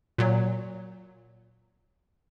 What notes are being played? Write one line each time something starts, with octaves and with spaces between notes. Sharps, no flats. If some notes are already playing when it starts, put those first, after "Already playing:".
A#2 F#3